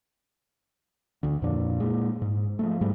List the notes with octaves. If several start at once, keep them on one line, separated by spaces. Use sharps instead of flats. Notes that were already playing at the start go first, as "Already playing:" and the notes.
D2 D3
F2 A#2 D4
A#2 G#3
G#2
F3 G#3 A3
G#2 G3 A3